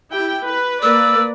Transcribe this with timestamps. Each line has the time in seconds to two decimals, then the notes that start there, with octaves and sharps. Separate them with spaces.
0.11 E4 G4 G5
0.46 B4
0.82 A#3 B4 D5 E6